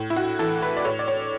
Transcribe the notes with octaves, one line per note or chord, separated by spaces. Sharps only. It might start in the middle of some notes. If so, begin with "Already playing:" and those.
Already playing: A2
E4
F#4
E3 A4
B4
D5
A2 C#5
D5
C#5